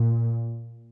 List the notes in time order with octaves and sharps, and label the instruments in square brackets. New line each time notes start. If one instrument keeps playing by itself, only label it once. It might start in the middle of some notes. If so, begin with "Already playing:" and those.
Already playing: [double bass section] A#2